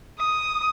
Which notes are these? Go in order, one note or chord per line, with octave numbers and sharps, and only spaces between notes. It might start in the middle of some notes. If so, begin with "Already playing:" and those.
D#6